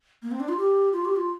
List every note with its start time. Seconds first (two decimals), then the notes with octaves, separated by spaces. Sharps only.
0.22 A#3
0.31 C4
0.40 D4
0.49 F4
0.58 G4
0.93 F4
1.05 G4
1.16 F4